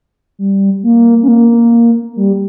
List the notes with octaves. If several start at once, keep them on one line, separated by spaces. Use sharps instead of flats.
G3
A#3
C#4
A#3
G3